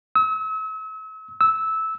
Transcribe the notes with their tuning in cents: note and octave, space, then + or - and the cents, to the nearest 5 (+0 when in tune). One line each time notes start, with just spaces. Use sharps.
E6 -40
E6 -15